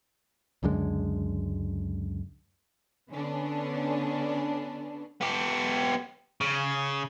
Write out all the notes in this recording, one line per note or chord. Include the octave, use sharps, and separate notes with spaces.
C#2 F#2 D3 G#3
D3 B3 C#4 D4
B3 G4
C#3